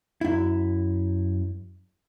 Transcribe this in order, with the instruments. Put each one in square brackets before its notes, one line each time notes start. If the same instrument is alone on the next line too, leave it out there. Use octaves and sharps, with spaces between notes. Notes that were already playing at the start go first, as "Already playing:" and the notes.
[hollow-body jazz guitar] F#2 E4